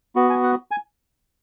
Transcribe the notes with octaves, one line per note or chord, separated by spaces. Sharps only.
B3 F#4
G#5
F#5
G#5